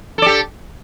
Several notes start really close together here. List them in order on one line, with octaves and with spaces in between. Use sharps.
A4 D5 G4